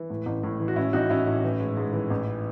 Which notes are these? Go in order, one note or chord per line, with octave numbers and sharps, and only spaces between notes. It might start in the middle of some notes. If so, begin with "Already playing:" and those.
Already playing: E3
A2
A1
A2
E3
F#4
A2 C#4 E4
A1 D#4 F#4
A2 C#4 E4
A2
E3
G#2
G#2
E3
A1